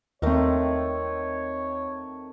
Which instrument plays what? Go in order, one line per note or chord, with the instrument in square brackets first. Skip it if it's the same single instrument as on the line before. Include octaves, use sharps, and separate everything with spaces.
[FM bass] D#2 [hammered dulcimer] D#3 A3 [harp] C4 A#4 [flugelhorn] C#5